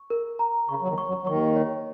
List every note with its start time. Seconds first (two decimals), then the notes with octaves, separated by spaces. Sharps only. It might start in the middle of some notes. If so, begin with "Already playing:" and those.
Already playing: C#6
0.10 A#4
0.39 A#5
0.69 C#3 C#6
0.82 F#3
0.88 D#2 D#3
0.98 C#6
1.07 F#2 F#3
1.22 F#3
1.27 D#2 D#3 C#6
1.56 C#5